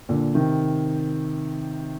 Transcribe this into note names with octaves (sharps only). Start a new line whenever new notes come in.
A#2 D3
C3 D#3